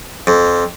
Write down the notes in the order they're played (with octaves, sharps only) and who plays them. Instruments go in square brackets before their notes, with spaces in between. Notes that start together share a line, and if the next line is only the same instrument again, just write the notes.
[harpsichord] F2